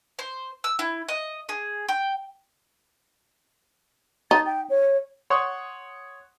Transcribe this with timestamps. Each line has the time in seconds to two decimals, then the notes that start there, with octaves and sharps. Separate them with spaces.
0.19 C5
0.64 E6
0.79 E4
1.08 D#5
1.49 G#4
1.89 G5
4.31 D#4 A6
4.46 G5
4.70 C#5
5.30 C#5 F#5 C6 C#6 D#6